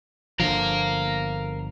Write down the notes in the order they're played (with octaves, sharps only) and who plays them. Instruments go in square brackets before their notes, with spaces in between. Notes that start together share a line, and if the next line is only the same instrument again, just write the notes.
[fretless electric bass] G1 D3 F3 [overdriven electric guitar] A#4 F5